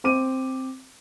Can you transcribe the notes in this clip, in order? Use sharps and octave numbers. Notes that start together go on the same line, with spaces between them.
C4 D6 D#7